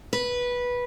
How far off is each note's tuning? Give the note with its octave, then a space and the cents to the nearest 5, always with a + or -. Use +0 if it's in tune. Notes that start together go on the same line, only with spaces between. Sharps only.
B4 -10